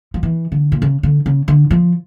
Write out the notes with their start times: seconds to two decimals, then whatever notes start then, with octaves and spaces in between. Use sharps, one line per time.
0.14 F3
0.23 E3
0.52 D3
0.72 A#2
0.82 C#3
1.03 D3
1.26 C#3
1.48 D3
1.71 F3